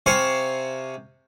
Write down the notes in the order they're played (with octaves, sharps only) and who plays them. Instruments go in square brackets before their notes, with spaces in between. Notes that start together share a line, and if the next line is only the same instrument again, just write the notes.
[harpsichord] C3 C5 F5 G#5 C#6